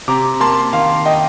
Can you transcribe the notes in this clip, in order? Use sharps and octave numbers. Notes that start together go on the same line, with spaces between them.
C3 A#5 D6
A#3 A5 C6
D#3 F5
D#5 G5